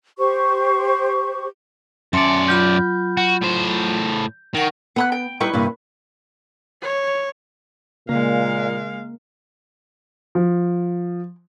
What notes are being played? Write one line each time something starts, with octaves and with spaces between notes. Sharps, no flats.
G4 C5 C#6
F#2 C#4 D5 E5 A5 C6 C#7
F#3 F4 B5 G6
F#4
A2 C5
D#3 A#4 F#5 C#6
B3 F#5 B5 F#6
G5
G3 D#4 E4 B4 G5 C#6
G2 C3 A#3
C#5
A#2 C#3 G#3 A#3 A#4 F5
F3